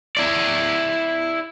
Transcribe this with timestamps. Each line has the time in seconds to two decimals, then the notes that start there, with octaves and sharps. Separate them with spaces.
0.17 E4 D5